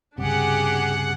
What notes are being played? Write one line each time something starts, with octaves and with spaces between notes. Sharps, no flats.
C#2 G2 C3 D4 G4 G#4 F#5